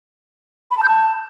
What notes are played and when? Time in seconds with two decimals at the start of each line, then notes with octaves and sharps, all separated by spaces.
0.71 B5
0.77 A5
0.83 G6
0.88 A5